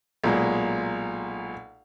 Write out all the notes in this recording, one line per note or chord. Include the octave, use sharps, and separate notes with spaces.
B1 A#2 G#3